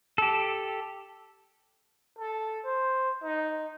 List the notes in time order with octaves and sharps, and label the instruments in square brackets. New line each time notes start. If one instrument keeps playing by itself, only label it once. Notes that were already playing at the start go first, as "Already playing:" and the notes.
[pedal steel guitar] G4 A4
[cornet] A4
C5
D#4